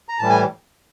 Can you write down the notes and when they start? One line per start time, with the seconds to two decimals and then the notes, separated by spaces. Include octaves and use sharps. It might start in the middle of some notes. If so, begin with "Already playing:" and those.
0.09 A#5
0.19 A2 E3 G3 A5
0.30 G#5